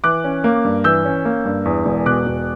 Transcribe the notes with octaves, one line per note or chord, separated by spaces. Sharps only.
E3 D6 F#6
C#4
A#3
G2
E3 E6 G6
C#4
A#3
G2
E2
E1
B2 D6 F#6
E1